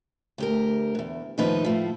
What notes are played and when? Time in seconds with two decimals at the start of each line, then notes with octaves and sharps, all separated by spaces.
0.38 D2 G4 A#4
0.95 E2 G#2
1.38 D#2 A2 D#3 F3 D#4 B4
1.64 A2 F3